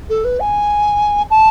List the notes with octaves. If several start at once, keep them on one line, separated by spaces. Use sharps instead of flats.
A4
B4
G#5
A5